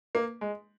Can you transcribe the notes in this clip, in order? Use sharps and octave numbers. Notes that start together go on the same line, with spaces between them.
A#3
G#3